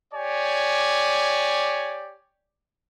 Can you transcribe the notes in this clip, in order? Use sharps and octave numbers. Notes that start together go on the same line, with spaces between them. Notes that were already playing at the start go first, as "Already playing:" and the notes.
G4 C#5 D5 G#5